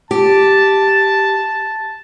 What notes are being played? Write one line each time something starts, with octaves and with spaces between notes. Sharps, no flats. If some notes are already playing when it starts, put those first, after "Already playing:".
G4 A5